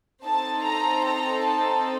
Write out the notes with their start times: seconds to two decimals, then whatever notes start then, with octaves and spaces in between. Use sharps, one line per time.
0.24 C4 D#4 A4 A5
0.65 A#5
1.04 A#5
1.45 A5